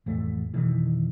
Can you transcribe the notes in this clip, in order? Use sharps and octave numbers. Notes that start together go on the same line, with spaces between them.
A1 F2 A3
F1 B2 D#3 E3